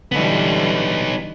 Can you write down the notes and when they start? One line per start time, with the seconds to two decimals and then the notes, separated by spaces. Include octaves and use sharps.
0.12 D3 E3 G3 B3 D#4